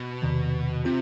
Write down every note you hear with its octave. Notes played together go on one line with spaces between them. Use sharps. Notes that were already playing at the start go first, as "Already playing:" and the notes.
Already playing: B2
E2 C3 D#3
C3 C4 F4